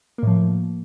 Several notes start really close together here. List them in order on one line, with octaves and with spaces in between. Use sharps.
A#3 A2 F3